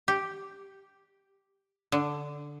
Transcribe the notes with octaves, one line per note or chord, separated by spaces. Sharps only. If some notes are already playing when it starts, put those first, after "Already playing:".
G4
D3